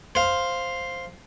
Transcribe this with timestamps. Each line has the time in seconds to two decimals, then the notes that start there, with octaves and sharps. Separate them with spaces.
0.15 C5 F5